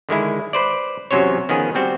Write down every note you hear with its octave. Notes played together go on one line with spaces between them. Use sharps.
D3 D#3 G#3 E4
B4 C5 D5
E2 C3 F#3 C#4 C5 C#5
D#3 F3 B3 C#4 G#4
G3 B3 C4 F#4